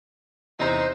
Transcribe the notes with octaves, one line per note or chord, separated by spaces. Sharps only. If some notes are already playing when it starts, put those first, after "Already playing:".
E2 C3 D#4 C5 A#5